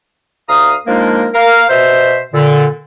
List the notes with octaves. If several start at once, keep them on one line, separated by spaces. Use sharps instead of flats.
D2 F5 A#5 D#6
F3 G#3 A#3 D4 D#4 A#4
A#4 F5
B2 C5 E5
A#2 D3